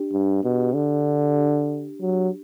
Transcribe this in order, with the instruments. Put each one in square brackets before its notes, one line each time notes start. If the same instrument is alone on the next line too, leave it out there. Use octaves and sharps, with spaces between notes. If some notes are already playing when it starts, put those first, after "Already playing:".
Already playing: [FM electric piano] D4 G4
[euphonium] G2
B2
D3
F#3